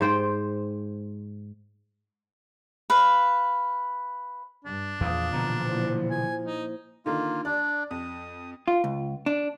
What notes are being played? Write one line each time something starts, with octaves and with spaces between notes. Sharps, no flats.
G#2 C5 G5
B4 F5
G2 D4
E2 A#2 F3 F5 D#6
B2 D3 E3 A#5
A#3 E4 C5
G#5
D#4
D3 D#3 A#3 F4
D4 D5
F2 D#6
F4
C#2
D4